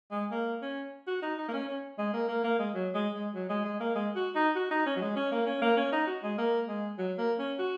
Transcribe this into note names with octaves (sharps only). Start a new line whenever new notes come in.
G#3
A#3
C#4
F#4
D#4
D#4
A#3
C#4
C#4
G#3
A#3
A#3
A#3
G#3
F#3
G#3
G#3
F#3
G#3
G#3
A#3
G#3
F#4
D#4
F#4
D#4
C#4
F#3
G#3
C#4
A#3
C#4
A#3
C#4
D#4
F#4
G#3
A#3
G#3
F#3
A#3
C#4
F#4